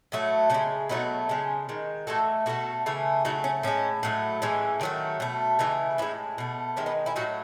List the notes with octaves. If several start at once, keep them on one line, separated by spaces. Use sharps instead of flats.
A2 F#3 A3
C#3 G#3 C#4
B2 F#3 A3 B3 D#4
C#3 G#3 C#4
D#3 G#3
A2 E3 A3 F#4 A4
B2 A3 F#4 A4
C#3 E3 A3
C#3 F#3 A3 D#4 F#4
C#4
A2 G#3 C#4
A2 F#3 A3
A2 E3 G#3 C#4
D#3 F#3 A3
B2 A3
C#3 E3 A3 B3 D#4
A2 G#3 C#4 E4
B2 A3
D#3 G#3 C#4 E4
B3 D#4
C#4 E4
A2 F#3 A3 D#4 F#4